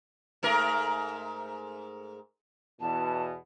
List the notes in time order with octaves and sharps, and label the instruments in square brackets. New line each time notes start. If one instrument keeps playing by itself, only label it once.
[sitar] G#2 A3 A#4
[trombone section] E2 B2 [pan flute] A5